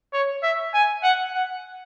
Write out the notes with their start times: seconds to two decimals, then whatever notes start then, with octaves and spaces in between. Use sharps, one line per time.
0.13 C#5
0.43 E5
0.74 G#5
1.03 F#5
1.34 F#5